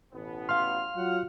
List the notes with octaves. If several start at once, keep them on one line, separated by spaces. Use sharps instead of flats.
A1 B2 B3
F5 C6 F6
F#3 F4 F#5